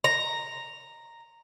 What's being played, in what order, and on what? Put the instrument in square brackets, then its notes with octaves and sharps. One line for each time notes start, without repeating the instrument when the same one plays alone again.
[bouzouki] A#5